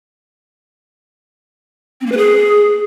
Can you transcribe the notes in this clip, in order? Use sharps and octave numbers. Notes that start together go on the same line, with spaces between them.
C4
A#3
B4
G#4